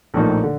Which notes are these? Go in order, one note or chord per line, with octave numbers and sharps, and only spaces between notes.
A#1 A2 F3 A#3 D#4
D3